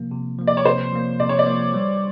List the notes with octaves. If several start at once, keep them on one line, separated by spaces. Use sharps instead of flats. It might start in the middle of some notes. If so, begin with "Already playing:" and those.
Already playing: C3 F3 A#3
C3
F3 A#3
D5
C#5
C3 C5
F3 A#3
C3 D5
C#5
D5
F3 A#3
G3